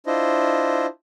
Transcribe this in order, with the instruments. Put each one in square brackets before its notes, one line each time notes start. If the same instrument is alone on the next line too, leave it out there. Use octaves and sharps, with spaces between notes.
[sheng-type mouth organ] D4 E4 F4 C5 D#5